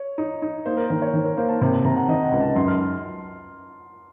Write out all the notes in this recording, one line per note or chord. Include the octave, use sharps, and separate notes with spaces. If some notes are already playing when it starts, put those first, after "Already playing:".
Already playing: C#5
D#4
D#4
A#3 C5
A#4
D#3 C5
C#5
D#3 C5
A#4
A#3 C5
A5
C3 A5
A5
C3 A#5
F#5
D#3 D#5
F#5
C#2
A5
F#2 C6
F6